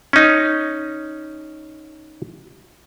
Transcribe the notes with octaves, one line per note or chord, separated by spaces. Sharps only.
C#4 D#4